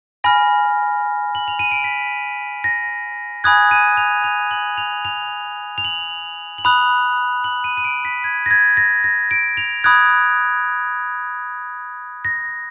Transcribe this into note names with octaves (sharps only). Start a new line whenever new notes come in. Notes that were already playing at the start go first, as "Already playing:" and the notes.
G#5 B5 F6 A#6
F#7
F7
D#7
D7
B6
A#6
G#5 B5 D#6 F#6 G#6
D#7
F7
F7
F#7
F7
F7
F7
F#7
F#7
B5 D#6 F#6 F7
F#7
D#7
D#7
D7
B6
G#6
A#6
G#6
A#6
A#6
D7
F7
B5 D#6 F#6 G#6
A#6